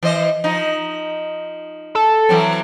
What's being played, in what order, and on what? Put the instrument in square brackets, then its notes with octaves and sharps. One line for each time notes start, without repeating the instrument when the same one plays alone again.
[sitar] E3 C5 D#5
F3 D#4
[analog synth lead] A4
[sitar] E3 F#3 C4